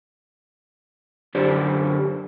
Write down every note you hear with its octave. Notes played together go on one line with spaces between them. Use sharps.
F#2 D3 G4 C5 D5